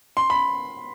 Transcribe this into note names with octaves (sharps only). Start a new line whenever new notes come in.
C6
B5